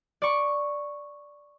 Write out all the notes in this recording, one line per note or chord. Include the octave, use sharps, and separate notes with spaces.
D5 C#6